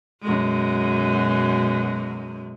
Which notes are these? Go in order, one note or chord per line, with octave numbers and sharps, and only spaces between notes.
F#2 B2 G#3